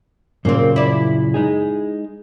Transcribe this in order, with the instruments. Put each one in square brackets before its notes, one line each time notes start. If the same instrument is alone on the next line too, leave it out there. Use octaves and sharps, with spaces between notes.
[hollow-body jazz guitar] F#2 A#2 C#3 [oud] A#3 C4
[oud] E4 D5
[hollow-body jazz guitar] G#3 D#4 G#4